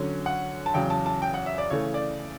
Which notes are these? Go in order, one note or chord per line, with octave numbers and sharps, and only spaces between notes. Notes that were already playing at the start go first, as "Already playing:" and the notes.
Already playing: D3 F#3 C#4
F#5
A5
E2 C#3 F#3 G5
A5
A5
G5
F#5
E5
D5
C#3 E3 A3 C#5
D5